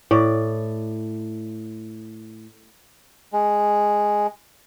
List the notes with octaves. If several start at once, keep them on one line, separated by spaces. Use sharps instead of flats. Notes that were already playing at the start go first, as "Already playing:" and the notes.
A2 D5
G#3